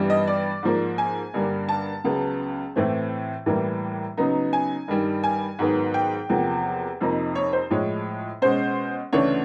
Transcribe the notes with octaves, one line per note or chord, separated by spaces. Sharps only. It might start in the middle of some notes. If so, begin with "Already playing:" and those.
Already playing: G2 E3 G3 B3
D#5
D5
G#2 F3 A#3
G#5
G2 D3 G3 A#3 D4
A5
C#2 C#3 F#3 B3
A2 E3 A3 C4
A2 E3 G3 A#3
C#3 F#3 B3 D#4
G#5
G2 D#3 G3
G#5
G#2 D#3 F#3 B3
G5
E2 C3 F3 A#3
F2 C3 F3 A#3 D#4
C#5
C5
A2 F3 G#3 C#5
B2 G#3 C#4 C5
D2 C#3 E3 A3 D4 C#5